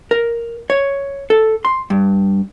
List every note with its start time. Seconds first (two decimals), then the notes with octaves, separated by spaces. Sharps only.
0.11 A#4
0.70 C#5
1.30 A4
1.65 C6
1.90 G2